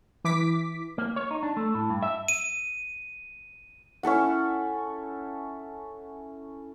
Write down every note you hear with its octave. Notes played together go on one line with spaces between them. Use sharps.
E3 D6 B6
A#3
C#5
D#4
D4
A3
A2
G2
E5
D#7
C#4 E4 A4 F#5